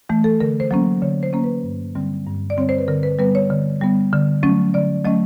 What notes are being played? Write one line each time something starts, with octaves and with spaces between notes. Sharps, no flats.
E3 A3
A4
D3 A#4
C5
F#3 A#3 C#4
D3 C#5
C5
F#3 A#3 C#4
B4
G2
D3 G3 C4
G2
D5
D3 G3 C4 C#5
C5
B4
D3 A#4
B4
G3 B3 B4
C#5
D3
G3 B3
D3
F#3 A3 C#4
D3 D5
F#3 A3 C#4 D#5